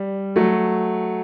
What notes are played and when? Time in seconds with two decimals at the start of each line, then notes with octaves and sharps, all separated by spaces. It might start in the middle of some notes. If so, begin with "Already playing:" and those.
Already playing: G3
0.36 F#3 A3